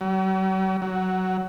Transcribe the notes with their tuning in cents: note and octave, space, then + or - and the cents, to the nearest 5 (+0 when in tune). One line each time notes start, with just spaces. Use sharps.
F#3 +45
F#3 +10